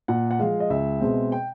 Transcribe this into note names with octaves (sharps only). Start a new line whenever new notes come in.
A#2 F#5
F#5
F3 G#3 F5
D#5
C#2 E5
B2 G#3 C4
G5